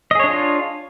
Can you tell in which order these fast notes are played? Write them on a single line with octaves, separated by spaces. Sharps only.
D#5 G#4 C#5 D4 F4